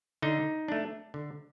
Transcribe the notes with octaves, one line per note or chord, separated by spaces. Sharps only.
D3 D#4
A3 D4
D3